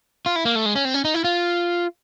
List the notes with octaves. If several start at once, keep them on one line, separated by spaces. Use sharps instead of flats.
F4
E4
A#3
A3
G#3
C#4
C4
C#4
D#4
E4
F4